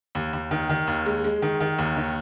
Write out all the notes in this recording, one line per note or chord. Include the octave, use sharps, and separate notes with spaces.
D#2
D#2
D#3
D#3
D#2
G#3
G#3
D#3
D#3
D#2
D#3